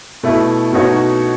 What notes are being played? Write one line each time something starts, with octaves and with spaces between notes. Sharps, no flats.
B2 A3 E4
B2 A3 D#4 F#4 C#5